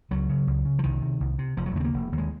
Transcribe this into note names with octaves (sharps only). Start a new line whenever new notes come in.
C#2 F#3
C#3
C#2
C#3
F3
C2 D#3
C3
C2
C3
F1 F3
F#3
D#2 C#3 G#3 C4
A#3
F1
D#2 C#3
G#3